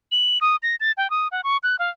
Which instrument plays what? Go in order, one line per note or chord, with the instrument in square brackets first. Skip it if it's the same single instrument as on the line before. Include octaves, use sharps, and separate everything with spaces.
[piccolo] F#7
D#6
A#6
A6
G5
D#6
F#5
C#6
F#6
F5